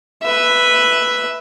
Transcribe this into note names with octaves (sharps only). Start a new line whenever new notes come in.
B4 E5